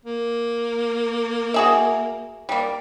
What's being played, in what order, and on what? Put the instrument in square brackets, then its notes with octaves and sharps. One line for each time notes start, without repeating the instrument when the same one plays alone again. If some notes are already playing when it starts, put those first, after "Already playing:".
[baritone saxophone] A#3
[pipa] F#4 G#4 E5
G3 A#3